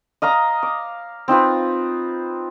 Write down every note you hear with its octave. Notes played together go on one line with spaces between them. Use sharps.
D#5 F5 A#5 D#6
D6
C4 D#4 F4 B4